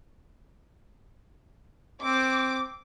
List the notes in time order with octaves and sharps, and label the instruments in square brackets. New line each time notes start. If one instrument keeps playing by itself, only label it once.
[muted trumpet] C4 [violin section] D6